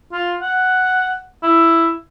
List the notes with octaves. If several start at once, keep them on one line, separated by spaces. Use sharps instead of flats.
F4
F#5
E4